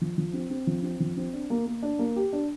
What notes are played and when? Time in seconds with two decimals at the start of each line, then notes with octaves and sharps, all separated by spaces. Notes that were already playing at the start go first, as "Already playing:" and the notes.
0.01 F3
0.18 F3
0.33 C4
0.50 C4
0.67 F3
0.83 C4
1.00 F3
1.17 C4
1.33 D4
1.50 A#3
1.66 A#3
1.83 D4
1.99 A#3
2.16 G4
2.33 D4